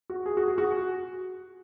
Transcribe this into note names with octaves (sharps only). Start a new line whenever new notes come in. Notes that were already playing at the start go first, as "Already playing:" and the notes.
F#4
G#4
F#4
G#4
F#4